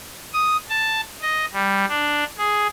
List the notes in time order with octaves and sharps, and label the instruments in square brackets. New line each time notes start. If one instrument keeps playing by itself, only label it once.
[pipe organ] D#6
A5
D#5
G3
D4
G#4